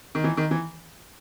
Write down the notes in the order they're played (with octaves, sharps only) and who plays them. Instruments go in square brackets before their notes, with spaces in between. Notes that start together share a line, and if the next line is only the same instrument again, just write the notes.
[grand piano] D#3
E3
D#3
E3